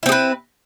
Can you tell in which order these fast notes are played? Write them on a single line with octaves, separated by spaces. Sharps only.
E4 C4 G#4 B4